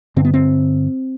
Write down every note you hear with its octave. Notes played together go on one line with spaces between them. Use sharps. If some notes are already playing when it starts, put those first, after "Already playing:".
G2 D3 C4
B3
C4